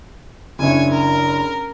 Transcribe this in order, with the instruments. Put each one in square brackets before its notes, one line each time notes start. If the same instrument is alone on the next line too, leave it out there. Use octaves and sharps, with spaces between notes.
[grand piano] F#1 D4 E4 [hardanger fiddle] C#5 G#5
[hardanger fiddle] A#4